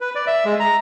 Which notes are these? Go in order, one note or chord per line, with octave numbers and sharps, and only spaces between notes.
B4
D5
E5
G#3
A#5